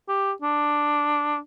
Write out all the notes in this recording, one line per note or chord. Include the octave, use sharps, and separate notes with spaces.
G4
D4